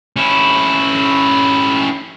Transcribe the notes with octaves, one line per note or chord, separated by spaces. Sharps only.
C#4 E4